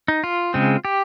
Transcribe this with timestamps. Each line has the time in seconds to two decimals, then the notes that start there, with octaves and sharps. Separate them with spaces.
0.08 D#4
0.24 F4
0.54 C#3 G#3 C4
0.85 G4